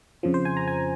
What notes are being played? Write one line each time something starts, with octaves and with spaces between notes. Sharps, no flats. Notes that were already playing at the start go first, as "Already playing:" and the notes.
F2 C#3 F3
C5
G#5
A#5
G#5